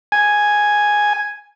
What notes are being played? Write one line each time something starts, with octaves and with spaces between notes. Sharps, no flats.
G#5